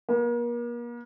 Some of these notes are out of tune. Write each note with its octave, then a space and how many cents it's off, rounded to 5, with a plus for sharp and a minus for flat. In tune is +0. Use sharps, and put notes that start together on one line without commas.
A#3 +40